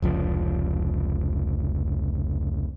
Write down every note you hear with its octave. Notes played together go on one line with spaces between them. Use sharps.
F1 C#2 F3